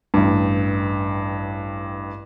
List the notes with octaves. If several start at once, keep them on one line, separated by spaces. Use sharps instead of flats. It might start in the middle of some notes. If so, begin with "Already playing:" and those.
A1 G2